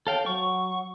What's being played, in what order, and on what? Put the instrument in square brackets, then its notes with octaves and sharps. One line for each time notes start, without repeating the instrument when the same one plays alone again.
[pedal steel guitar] A4 F5 G5 [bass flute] C#5
[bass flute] F#3 [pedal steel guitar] C#6